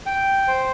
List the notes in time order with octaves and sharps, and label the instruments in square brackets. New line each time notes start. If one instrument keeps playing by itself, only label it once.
[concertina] G5
C5